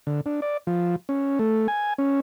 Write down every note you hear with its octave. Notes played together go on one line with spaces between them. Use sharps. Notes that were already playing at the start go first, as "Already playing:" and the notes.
D3
D4
D5
F3
C#4
A3
G#5
C#4